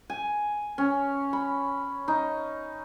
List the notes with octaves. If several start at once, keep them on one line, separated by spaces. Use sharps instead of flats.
G#5
C#4
B5
D#4